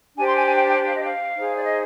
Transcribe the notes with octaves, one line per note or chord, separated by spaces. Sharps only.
D4 G4 C5 G#5
C6
G#5
G#5
G5
G5
F5
D#5
F5
D#4 G#4 C5
D5
D#5